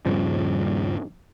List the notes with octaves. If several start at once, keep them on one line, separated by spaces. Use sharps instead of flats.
D#1 G2 C#3 F3